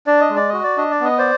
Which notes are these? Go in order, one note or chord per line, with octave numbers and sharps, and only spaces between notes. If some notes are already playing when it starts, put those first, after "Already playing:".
D4 D5
D#5
G#3
D5
F#4 D#5
D5
D4 D#5
D5
B3 D#5
C5 D5